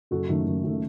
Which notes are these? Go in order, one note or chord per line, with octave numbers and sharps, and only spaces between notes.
F#1 F#4 A4
F#2 D#3 A3
F#1
F#2 D#3 A3